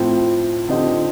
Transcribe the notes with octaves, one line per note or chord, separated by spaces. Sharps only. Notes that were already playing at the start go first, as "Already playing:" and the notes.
Already playing: A2 F3 C4
D3 F3 C4 D#4 G4